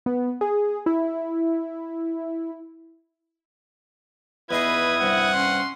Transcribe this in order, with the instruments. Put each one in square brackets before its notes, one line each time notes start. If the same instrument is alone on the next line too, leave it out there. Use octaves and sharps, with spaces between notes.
[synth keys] B3
G#4
E4
[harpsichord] E2 D#4 G#4 [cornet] E4 [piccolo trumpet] B4 [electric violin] D#6 G#6
[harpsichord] G2 C3 [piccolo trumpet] F#5
[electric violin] C#4 C6